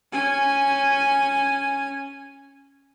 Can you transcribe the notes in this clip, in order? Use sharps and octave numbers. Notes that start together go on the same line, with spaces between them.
C#4 G#5